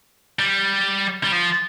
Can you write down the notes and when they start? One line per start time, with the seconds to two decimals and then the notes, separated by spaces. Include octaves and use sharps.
0.39 G3
1.24 G3
1.32 F3